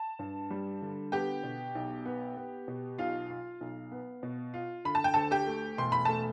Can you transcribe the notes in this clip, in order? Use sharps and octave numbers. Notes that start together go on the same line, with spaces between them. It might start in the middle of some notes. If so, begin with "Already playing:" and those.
Already playing: A5
G2
G3
D3
B3 G4 G5
B2
B1
B3
B3
B2
B1 F4 F5
F4
B1
B3
B2
F4
D3 B5
A5
G5
D2 A4 A5
G4 G5
A3
E1 C6
B5
A3 A5